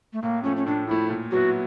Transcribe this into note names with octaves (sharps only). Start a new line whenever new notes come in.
A3
A2 A#3
F3 A3 C#4
C#4
A2 D4
F3 A3 E4
A#2
F#3 B3 E4 F#4